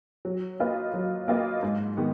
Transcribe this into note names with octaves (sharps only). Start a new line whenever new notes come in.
F#3
A#3 F4 B4 D#5
F#3
A#3 F4 B4 D#5
G#2
D#3 G#3 B3